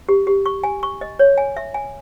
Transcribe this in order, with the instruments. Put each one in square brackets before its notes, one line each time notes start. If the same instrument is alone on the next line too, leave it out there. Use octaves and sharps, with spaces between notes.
[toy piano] G4
G4
C#6
G#5
C#6
D#5
C#5
G#5
E5
G#5